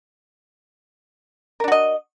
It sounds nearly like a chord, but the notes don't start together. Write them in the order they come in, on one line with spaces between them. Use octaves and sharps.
A#4 D4 F#4 D#5